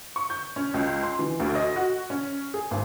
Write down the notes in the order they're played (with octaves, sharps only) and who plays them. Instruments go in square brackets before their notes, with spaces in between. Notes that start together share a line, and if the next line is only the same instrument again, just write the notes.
[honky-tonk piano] C#6
G6
C#4
C#2
C6
E3
D2
D#5
F#4
C#4
G#4
G#1